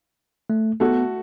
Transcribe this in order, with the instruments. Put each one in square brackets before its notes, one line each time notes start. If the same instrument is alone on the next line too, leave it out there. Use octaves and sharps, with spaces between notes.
[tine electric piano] A3
[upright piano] A3 F#4 A4 [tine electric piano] B3